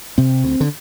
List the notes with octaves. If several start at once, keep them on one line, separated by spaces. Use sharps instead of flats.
C3 C4
D2
D3